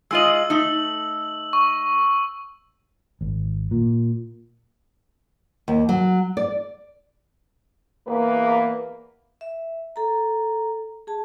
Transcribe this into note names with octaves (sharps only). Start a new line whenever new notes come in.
G#3 F4 D#5 E6 F#7
A3 D#4
C#6
G#1
A#2
D#2
F#3
D5
E2 A#3 B4
E5
A4 A#5
G#4 A5